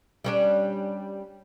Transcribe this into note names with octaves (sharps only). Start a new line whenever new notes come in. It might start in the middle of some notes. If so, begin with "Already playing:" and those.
G3 C#4 D4